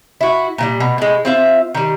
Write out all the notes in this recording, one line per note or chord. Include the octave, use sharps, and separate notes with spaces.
E4 F#4
A#2 F3 G3
B2
A2 G#3
C4 F4 E5
D#3 G3